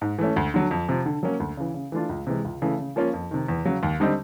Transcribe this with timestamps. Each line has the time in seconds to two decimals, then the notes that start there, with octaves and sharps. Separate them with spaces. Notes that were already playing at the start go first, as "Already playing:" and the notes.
0.01 G#2
0.19 E3 A3 C#4
0.36 D2
0.54 D3 F#3
0.71 F2
0.88 C3 F3
1.06 D3
1.23 F#3 A#3 C#4
1.40 D2
1.57 C#3 E3
1.74 C#3
1.92 E3 A3 D4 F4
2.09 C#2
2.27 C3 E3 G#3
2.45 C#2
2.62 C#3 E3 A3
2.79 C#3
2.96 F3 A#3 C#4 F4
3.13 F2
3.31 C3 D#3
3.48 E2
3.65 C#3 F#3
3.83 D#2
4.00 D3 G3 C4 D#4